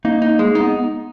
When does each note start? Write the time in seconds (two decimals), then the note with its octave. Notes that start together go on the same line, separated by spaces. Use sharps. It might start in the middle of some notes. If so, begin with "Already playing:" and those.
0.05 A#3 D#4
0.22 D#4
0.39 G#3
0.55 D#4
0.60 B3